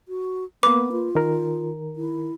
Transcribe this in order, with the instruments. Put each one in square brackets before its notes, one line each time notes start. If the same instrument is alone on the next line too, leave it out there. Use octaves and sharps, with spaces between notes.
[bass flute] F#4
[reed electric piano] A#3 B4 [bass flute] B3 [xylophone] D6
[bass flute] F4
[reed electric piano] D#3 A#4
[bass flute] E4